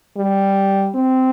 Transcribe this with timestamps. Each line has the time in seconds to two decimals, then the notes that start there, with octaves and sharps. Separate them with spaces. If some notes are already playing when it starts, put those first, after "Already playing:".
0.17 G3
0.95 C4